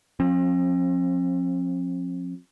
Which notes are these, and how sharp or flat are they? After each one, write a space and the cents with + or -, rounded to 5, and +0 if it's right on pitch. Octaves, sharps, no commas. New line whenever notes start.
F3 +25 C4 +45